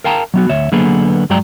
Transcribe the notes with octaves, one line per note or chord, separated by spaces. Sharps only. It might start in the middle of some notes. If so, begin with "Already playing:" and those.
A#4 F5 G5 A5 A#5
F#3 B3 F#4
D2 C#5 E5
D3 F#3 A#3 B3 G#4 B4
G2 F#3 G#3 D5 G5 A#5